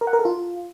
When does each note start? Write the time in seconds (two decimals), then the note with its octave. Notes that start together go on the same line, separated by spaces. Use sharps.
0.01 A#4
0.07 F#5
0.13 A#4
0.19 A4
0.25 F4